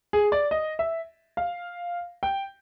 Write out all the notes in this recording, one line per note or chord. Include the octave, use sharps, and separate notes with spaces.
G#4
D5
D#5
E5
F5
G5